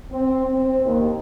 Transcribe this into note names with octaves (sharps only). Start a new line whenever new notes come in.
C4
C4
D#2